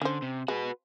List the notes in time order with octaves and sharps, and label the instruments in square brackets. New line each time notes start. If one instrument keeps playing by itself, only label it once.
[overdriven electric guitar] D3 [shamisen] C#4 C5
[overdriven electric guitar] C3
[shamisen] G#3 [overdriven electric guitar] F#4 B4